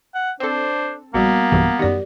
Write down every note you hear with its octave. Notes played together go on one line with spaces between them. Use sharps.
F#5
C4 D4 A4 C5
A#1 G3 A#3 B3 F#4
B1 G2 E3
F#2 D#3 G4 A#4 D5